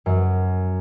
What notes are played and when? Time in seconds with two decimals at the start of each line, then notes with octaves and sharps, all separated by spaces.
0.06 F#2 F#3